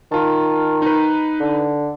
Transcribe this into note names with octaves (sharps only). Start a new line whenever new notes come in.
D#3 F4 A5
D#4 B4
D3